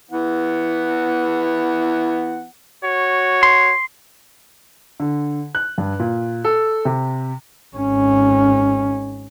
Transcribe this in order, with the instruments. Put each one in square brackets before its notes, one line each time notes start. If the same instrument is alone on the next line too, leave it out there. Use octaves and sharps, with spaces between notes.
[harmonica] E3 B3 F#5
[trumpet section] F#4 C#5
[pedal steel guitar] C6
[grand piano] D3
F#6
G2
A#2
A4
C3
[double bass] G#1 C#4